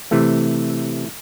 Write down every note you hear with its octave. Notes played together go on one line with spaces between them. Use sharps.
C3 E3 A3